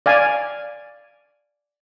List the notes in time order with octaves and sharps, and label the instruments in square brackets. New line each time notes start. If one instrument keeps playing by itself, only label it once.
[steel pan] D5 F5 G#5